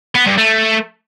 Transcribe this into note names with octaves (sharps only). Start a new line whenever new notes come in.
B3
G2
A3